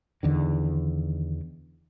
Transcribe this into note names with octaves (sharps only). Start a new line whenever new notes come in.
E2 D3 D#3